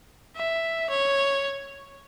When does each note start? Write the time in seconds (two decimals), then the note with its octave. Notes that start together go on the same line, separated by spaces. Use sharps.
0.36 E5
0.90 C#5